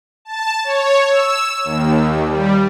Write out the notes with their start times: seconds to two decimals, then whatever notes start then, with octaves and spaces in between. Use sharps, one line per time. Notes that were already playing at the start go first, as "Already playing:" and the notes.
0.25 A5
0.64 C#5
1.09 E6
1.64 D#2
2.27 G3